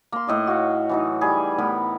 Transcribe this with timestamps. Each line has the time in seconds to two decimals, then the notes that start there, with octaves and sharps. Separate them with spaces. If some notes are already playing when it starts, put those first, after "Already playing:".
0.12 A#3 C6
0.27 A2 D#5 D6
0.47 F#4 C#5 F5
0.89 E3 F#3 D#4
1.21 G3 G#4 B5
1.58 A2 B3 A#4 B5